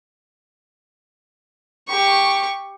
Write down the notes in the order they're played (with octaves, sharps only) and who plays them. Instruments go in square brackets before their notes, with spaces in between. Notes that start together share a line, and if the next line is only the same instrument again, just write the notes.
[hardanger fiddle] G4 C#6